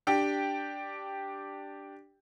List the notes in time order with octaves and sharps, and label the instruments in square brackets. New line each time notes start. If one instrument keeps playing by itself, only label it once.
[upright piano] D4 G4 G5